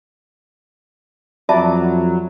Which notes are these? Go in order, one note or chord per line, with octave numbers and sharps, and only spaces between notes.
F2 F#3 D5 E5 A5 B5